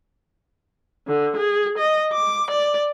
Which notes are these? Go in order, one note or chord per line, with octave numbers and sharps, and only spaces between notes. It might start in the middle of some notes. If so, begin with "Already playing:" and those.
D3
G#4
D#5
D6
D5